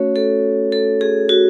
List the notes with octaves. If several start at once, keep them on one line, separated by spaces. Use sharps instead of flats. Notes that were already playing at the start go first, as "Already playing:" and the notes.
Already playing: A3 C#4 F#4 C#5
A4
A4
G#4
F#4